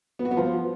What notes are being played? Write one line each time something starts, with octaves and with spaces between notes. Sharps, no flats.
B3
F#4
B3
F3